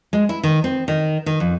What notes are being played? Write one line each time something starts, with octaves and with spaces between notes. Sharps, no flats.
G#3
E4
D#3
C4
D#3
D#3
F2